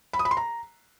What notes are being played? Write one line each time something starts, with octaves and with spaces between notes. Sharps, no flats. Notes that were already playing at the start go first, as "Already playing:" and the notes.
B5
D#6
B5
C6
A#5